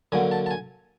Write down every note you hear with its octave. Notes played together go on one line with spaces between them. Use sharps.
D3 F#3 A#3 G#5
A5
A5
G#5